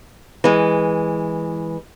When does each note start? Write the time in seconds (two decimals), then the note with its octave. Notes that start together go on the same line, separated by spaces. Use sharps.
0.44 E3 G#3